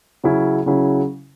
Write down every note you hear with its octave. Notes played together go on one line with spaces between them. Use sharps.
C#3 F#3 C#4 E4
C#3 F#3 C#4 E4